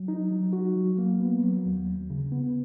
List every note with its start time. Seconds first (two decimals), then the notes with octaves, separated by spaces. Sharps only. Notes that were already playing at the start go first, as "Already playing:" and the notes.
Already playing: F#3
0.08 D#4
0.31 F#3
0.53 F#4
0.76 F#3
0.98 A#3
1.20 B3
1.44 F#3
1.65 D#2
1.88 D#2
2.10 C#3
2.32 B3